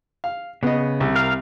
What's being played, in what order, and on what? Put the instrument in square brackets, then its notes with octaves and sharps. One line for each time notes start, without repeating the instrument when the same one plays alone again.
[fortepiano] F5
[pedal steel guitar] C#3 [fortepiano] B3 D#5
[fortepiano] C2
[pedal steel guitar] A#4 F5